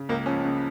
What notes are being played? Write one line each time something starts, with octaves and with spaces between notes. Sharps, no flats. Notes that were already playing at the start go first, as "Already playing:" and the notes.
Already playing: C#3
C#2 A#3
F3 C#4
C#3